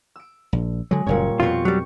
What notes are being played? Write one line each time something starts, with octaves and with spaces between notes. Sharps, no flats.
E6 D7
A#1
D3 F#3 G#3
F#1 F#2 A#2 G3 C#5
F2 B2 C4 F4 C#6
F#3 G3